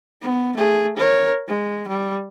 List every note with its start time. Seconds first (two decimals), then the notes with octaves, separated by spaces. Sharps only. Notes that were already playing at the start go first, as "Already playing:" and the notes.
0.22 B3
0.56 A3 G#4
0.97 A#4 C#5
1.48 G#3
1.88 G3